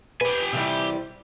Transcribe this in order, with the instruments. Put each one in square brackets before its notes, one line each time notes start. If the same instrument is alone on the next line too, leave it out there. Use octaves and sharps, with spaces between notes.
[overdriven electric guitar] G4 G#5 [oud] B4
[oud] C3 E3 G3